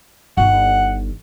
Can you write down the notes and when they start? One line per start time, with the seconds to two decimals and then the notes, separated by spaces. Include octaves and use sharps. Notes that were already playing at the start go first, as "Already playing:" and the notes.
0.37 G1 D#3 F#5